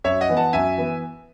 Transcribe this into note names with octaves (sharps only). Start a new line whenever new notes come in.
F#2 C#5 E5
D#5 F#5
E3 B3
F#5 A5
F#2 E5 G#5
E3 B3